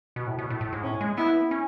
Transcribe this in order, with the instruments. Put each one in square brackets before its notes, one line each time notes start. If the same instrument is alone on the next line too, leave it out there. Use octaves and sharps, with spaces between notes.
[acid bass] B2
A2
B2
A2
A2
G#2
[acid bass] A2 [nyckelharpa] C#4
[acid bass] G#3
[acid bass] B3 [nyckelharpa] E4
[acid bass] C#4